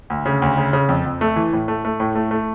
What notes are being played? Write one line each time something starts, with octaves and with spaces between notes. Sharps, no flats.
D2
C#3
D2
C#3
C#3
F2
F2
A3
E3
A2
A3
A3
A2
A3
A3